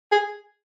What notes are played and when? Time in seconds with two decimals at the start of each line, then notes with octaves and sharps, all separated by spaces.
0.12 G#4